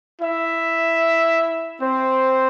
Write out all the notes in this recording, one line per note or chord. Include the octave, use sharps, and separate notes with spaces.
E4 E5
C4 C5